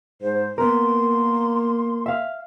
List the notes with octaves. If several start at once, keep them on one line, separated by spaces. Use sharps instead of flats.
G#2 C5
A#3 B3 A#4 C6
E5 F5